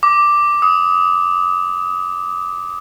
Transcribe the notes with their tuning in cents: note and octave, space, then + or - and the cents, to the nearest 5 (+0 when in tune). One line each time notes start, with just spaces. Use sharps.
D6 +5
D#6 +30